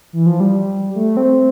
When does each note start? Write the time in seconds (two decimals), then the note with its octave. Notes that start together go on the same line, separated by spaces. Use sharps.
0.13 E3
0.26 F3
0.40 G3
0.95 A3
1.17 C4